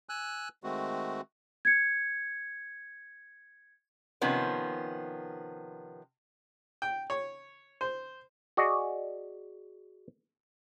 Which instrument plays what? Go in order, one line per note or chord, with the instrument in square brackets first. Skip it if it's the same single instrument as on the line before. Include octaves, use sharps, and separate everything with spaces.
[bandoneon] G#5 E6 F#6
D#3 G#3 A3 C4 F#4
[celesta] G#6 C#7
[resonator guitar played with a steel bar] C3 D#3 F3 B3 C#4
[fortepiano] G5
C#5
C5
[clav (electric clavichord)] F#4 G#4 D5 D#5